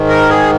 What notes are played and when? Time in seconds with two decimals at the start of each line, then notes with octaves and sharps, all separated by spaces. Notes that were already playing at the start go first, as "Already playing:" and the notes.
Already playing: G#2 D#3
0.09 A#4
0.30 G#4